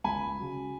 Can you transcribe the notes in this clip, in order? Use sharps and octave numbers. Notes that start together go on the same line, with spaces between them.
C#2 G#5 B5
C#3 F#3